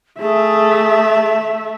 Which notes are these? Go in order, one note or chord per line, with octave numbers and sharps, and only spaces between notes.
A3 G#4 E5